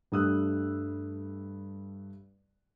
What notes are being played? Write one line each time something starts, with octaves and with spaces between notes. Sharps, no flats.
G2 G3 A3 D#6 E6 F#6